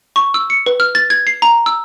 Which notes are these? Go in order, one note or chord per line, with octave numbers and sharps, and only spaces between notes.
C#6
E6
C#7
B4
F6
A6
G#6
C7
A#5
E6